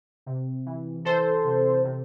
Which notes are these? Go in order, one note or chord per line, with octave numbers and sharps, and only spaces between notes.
C3
E3
E3 A4 C5
C3
C3